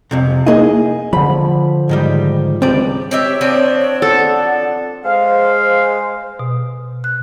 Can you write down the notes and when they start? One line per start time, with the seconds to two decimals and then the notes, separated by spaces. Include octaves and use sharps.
0.11 C2 F2 C3
0.47 A#3 D#4 E4 G#4 D#5
1.13 D3 F3 B5
1.89 G#2 D#3 G3
2.62 C#2 G3 C4 D5
3.11 C4 G4 C#5 E5
3.41 F3 C4 D4
3.80 C#5
4.02 A4 F#5
5.05 G#3 C5 F5
6.39 B2
7.04 F#6